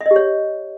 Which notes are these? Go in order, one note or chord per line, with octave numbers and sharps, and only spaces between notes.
E5
D#5
G4
C#5